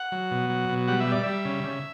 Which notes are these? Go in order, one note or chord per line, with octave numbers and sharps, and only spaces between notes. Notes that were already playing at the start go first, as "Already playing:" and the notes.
Already playing: F#5
F#3
B2
F#3
B2
G3 F#5
E5
G3 D5
G3 E5
C#3
C#3